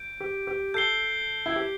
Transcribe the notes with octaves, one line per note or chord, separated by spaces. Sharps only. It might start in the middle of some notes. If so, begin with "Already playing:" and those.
Already playing: G6 D7
G4
G4
A4 G6 C7 G7
E4
G4